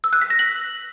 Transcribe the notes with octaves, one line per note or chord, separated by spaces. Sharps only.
E6
F#6
B6
A#6
F#7